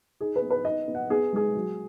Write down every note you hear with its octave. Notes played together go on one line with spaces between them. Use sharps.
D#4 G#4
B4
B3
B4
D#4 D#5
B3
F#5
B3 G#4
G#3 G#4
F#3